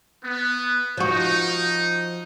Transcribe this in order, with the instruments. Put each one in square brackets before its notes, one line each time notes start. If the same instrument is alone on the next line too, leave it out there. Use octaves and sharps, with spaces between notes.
[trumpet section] B3
[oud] F3 F#4 [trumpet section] D#4